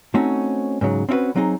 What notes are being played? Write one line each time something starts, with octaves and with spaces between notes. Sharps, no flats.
A3 C4 C#4 D#4 F#4
G#2 C#3 F#3
C4 C#4 E4 F#4 B4
F#3 C4 D#4 G#4